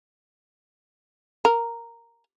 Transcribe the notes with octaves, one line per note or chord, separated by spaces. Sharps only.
A#4